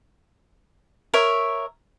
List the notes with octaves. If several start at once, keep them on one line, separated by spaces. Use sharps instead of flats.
A#4 C#5 E5